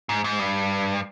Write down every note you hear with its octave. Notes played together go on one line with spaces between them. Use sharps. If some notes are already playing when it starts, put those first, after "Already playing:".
G#2
G#2
G2